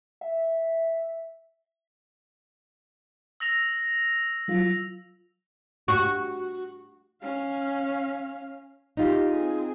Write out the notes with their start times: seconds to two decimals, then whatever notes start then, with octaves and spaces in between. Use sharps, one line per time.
0.21 E5
3.40 E6 A#6 F7
4.48 F#3 F4
5.88 F#4
7.22 C#4 F5
8.97 D#4 F4 G4
9.30 C4 G#4